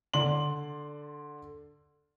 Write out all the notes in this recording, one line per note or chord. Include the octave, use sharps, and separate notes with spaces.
D3 D5 C6 F#7